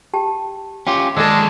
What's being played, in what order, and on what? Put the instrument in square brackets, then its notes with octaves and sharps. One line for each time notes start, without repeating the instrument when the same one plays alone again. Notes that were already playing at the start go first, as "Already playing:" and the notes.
[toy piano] G4 G5 A5
[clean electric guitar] C#4 F4 G4 [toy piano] G5
[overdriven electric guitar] D#2 A5 [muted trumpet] G#3 [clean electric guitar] D4 [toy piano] A4 E6